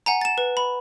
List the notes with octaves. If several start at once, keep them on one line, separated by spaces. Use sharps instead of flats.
F#5 G#5 A#5
A6 E7
B4
B5